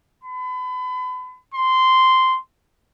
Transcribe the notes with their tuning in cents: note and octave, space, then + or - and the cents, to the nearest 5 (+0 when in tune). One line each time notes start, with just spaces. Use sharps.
B5 +35
C6 -10